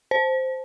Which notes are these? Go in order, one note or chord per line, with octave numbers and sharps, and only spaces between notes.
C5